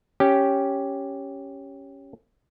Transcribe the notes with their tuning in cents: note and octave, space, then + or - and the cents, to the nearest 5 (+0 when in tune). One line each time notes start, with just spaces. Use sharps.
C#4 +0 G4 +0